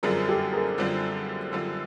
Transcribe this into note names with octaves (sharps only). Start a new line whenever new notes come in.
F#2 D3 G3 C4 F4 G#4 A#4
G4 A4
G#4 A#4
F#2 D3 G3 C4 F4
F#2 D3 G3 C4 F4